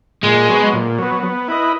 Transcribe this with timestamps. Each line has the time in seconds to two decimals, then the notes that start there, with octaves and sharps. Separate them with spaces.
0.24 A#2 G#3
0.49 F#3 B3
0.73 A#2
0.98 F#3 B3
1.23 B3
1.48 E4 B4 D#5